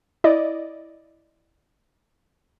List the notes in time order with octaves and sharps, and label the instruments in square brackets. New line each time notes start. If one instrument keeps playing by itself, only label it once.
[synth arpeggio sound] E4 D5 D#5